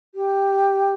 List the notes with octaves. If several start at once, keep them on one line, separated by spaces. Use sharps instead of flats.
G4